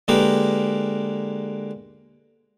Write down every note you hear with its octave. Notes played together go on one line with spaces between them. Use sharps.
D3 G#3 A#3 G4 A#4 B4